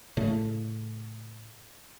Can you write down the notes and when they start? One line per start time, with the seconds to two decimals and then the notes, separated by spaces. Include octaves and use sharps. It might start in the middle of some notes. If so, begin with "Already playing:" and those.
0.17 A2 C#3 A3